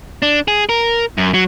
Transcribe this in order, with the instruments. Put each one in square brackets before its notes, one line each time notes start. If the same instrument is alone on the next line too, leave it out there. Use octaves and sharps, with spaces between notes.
[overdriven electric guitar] D4
G#4
A#4
F#2
F#3